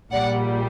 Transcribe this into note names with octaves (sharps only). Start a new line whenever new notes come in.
A#1 A#2 G3 D5 F#5